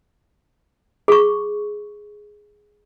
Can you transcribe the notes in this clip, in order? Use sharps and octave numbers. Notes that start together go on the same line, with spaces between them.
G#4 C#6